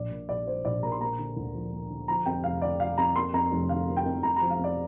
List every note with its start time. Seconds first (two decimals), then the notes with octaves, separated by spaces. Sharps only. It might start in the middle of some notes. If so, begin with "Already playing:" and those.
Already playing: A#1 D5
0.11 A#2
0.29 A#1 D5
0.47 F3 C5
0.65 A#1 D5
0.83 A#2 A#5
0.92 C6
1.01 A#3 A#5
1.19 D3
1.37 D2
1.55 F3
1.72 A#3
1.90 D3
2.08 F3 A#5
2.26 F2 G5
2.44 F1 F5
2.62 D3 D5
2.80 F3 F5
2.98 F2 A#5
3.16 A#3 C6
3.34 F2 A#5
3.52 F1
3.69 D3 F5
3.88 A#3
3.97 G5
4.06 F2
4.23 F2 A#5
4.36 A#5
4.41 F3
4.50 F5
4.59 F2
4.64 D5